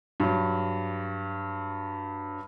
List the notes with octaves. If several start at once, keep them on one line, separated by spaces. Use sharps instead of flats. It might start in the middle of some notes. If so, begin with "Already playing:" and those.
G2 F#3